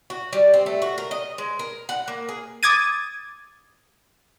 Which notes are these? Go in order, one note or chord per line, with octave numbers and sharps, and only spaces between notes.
F#4
G3
C4
A3
F#4
A#4
D#5
G#3
A#4
F#5
A#3
G#4
D6 D#6 G#6 A6 D#7